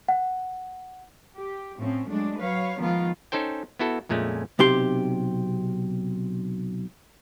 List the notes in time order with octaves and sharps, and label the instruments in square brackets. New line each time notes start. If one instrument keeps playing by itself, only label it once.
[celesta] F#5
[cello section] G4
A2 F3 C4 C#4
F#3 G#3 A3 D4
F#3 B4 C#5 F5
D#3 F3 G#3 B3 F4
[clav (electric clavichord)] C#4 D#4 A4 C5 G5
B3 E4 F#4 A4
F2 A#2 G#3 A3 C#4
[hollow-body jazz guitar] B1 C3 G4 C6